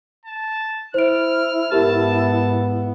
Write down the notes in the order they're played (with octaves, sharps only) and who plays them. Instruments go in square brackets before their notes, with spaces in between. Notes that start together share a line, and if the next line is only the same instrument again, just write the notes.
[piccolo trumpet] A5
[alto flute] E4 [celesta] C5 D7 [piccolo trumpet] F6
[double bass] G#2 B3 [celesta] G4 A#4 [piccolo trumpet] A5